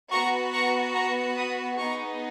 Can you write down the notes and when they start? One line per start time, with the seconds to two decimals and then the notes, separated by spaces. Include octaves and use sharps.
0.11 B3 F#4 A#5 C#6
0.53 A#5 C#6
0.94 A#5 C#6
1.36 B5 D#6
1.78 B3 D#4 G#4 A#5 C#6